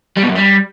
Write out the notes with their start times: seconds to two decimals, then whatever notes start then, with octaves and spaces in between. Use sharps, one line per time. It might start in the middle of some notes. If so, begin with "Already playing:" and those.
0.17 G3
0.23 B2
0.29 F#2
0.35 G3